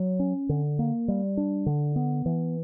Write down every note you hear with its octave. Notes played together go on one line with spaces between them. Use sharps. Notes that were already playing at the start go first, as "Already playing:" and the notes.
Already playing: F#3
C#4
D3
A#3
G3
D4
D3
B3
E3